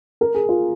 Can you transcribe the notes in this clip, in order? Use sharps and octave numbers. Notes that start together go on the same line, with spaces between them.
A#4
G#4
F4